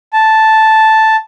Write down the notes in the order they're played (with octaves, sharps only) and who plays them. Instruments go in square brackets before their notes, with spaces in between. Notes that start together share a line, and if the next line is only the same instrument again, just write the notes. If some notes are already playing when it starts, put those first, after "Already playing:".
[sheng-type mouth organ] A5